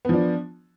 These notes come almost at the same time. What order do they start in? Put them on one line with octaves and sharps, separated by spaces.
B3 F3 D4